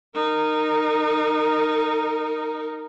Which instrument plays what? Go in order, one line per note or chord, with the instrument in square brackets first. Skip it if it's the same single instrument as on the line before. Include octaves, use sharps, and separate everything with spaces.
[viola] D#4 A#4